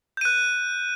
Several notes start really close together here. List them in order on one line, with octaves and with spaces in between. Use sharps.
G6 D#7 F#6